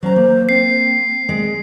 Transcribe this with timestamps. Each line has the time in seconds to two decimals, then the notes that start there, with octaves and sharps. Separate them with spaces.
0.03 F#3 C#4 C5 A#5
0.16 A#3
0.49 C4 C7
1.29 G#3 G#4